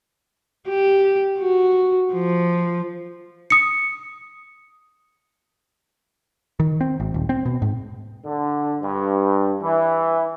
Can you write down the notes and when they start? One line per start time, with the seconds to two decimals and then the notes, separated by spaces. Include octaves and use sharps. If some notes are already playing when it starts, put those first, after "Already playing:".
0.69 G4
1.39 F#4
2.12 F3
3.50 D#6 C#7
6.60 D#3
6.81 C4
7.00 G#1
7.14 D#1
7.29 C4
7.46 B2
7.62 G#2
8.25 D3
8.83 G2
9.62 E3